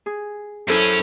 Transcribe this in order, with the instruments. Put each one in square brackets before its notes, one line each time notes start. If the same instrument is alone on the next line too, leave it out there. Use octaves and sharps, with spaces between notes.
[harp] G#4
[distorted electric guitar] F#2 C#4 [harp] E4 A4 C5